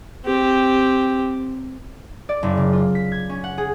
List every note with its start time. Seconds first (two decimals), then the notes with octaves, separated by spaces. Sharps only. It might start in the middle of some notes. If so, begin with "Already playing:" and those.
0.25 C4 G4
2.29 D5
2.43 F#1
2.58 C#3
2.73 F4
2.95 B6
3.12 G#6
3.29 C#4
3.44 F#5
3.58 G#4